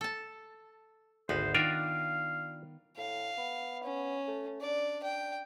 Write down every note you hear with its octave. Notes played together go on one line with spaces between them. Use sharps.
A4 A5
G#1 D2 B3 C5
D#3 D4 F4 A#4 F5
A2 F5
B3
C#4
A3
D4 D5
G5